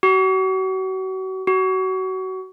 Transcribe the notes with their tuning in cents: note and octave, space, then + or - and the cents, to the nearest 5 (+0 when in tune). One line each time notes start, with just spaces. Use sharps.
F#4 +35
F#4 +25